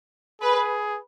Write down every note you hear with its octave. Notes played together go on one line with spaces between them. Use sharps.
G#4 B4